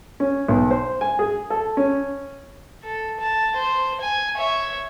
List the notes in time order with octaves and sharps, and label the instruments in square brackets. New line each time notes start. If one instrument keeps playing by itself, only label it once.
[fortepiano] C#4
B1
C5
G#5
G#4
A4
C#4
[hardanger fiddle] A4
A5
C5
G#5
C#5 E5